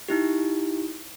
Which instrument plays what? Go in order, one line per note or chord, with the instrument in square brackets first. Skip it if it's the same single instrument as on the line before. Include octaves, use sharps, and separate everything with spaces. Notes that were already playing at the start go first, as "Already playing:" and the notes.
[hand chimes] D#4 E4 G4